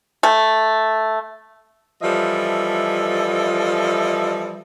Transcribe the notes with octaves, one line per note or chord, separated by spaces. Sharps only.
A3
E3 F3 G3 A4 D#5 E5